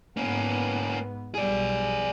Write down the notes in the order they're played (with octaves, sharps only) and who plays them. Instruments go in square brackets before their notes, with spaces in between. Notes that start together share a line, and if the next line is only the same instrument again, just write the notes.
[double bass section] G#2 B3 [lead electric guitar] A#3 C#4
[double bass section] B1 G3 [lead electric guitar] G#4 D5